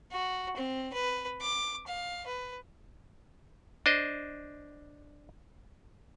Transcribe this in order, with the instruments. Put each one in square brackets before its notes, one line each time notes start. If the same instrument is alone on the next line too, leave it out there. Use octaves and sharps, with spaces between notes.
[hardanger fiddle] F#4
C4
B4
D6
F5
B4
[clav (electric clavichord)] D4 C5 D#5